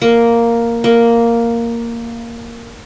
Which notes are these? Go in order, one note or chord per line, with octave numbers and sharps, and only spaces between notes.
A#3
A#3